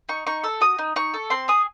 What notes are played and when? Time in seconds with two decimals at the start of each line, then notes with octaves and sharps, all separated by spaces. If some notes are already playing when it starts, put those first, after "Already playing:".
0.09 D#4 C#6
0.27 D#4 C#6
0.43 A4 E6
0.61 F#4 D#6
0.78 D#4
0.96 D#4 C#6
1.14 A4
1.30 C4 C6
1.48 G#4 D#6